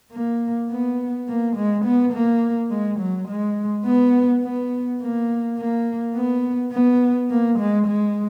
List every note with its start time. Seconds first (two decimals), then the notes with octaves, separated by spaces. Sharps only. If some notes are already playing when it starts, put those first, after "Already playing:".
0.13 A#3
0.70 B3
1.28 A#3
1.56 G#3
1.85 B3
2.13 A#3
2.70 G#3
3.00 F#3
3.29 G#3
3.86 B3
4.43 B3
5.00 A#3
5.58 A#3
6.15 B3
6.73 B3
7.30 A#3
7.59 G#3
7.87 G#3